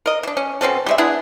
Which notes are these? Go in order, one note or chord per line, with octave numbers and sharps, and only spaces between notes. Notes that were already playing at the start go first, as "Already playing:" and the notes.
A#4 D#5
E3 D4
C#4
B2 C4 C#4 A4
G3 G#3 E5
B3 D4 E4 G#4